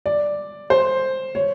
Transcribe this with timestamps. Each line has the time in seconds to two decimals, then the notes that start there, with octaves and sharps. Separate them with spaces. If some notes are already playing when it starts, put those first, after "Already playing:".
0.06 D5
0.70 C5
1.35 C#5